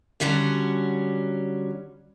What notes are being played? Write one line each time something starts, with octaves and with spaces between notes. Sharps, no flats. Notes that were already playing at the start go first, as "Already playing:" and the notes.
D3 F#3 G3 C#4 F#4